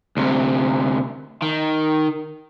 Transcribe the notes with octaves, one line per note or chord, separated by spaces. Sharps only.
D2 C3
D#3